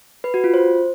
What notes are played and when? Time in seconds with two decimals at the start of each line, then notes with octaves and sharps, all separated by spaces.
0.24 B4
0.34 F#4
0.44 F4
0.54 C5